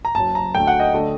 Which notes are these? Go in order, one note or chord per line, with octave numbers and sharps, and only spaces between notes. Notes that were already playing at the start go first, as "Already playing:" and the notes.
A#5
F#1 F#2 F#3 A5
A#5
D2 D3 A3 G5
F#5
D#5
D3 A3